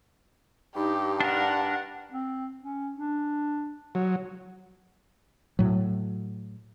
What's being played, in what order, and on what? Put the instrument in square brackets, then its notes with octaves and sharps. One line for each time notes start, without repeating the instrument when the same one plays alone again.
[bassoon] G2 [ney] D#4 [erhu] G4
[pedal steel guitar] D4 A#4 [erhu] F#5
[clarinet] C4
C#4
D4
[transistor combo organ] F#3
[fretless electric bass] A2 F#3